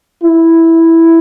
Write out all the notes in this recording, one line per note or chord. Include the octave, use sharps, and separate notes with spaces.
E4